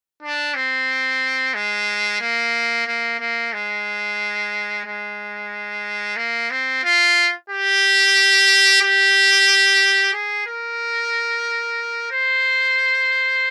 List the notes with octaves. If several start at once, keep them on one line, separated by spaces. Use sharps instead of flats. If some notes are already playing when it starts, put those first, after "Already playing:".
D4
C4
G#3
A#3
A#3
A#3
G#3
G#3
A#3
C4
F4
G4
G4
G#4
A#4
C5